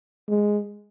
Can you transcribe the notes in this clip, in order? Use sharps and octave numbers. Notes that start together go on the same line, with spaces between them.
G#3